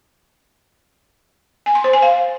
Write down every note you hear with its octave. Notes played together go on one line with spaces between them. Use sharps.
G#5
C6
C5
G#5
F5